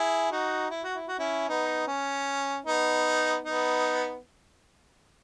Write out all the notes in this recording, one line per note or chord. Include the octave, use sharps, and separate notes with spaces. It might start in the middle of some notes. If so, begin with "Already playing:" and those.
Already playing: E4 G#4
D#4 F#4
E4
F#4
E4
F#4
C#4 E4
B3 D#4
C#4
B3 D#4
B3 D#4